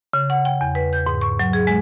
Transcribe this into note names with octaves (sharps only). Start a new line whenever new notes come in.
C#3
F#5
G5
E2
B4
G6
G#2
C#6
F#3
G#4
G#3